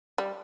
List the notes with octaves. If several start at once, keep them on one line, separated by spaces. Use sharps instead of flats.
G3